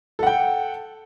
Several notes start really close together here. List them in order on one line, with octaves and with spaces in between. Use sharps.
A4 F#5 G5